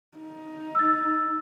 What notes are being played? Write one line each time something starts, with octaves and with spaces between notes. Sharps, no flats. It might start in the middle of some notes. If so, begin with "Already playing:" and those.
D#4
E6 A6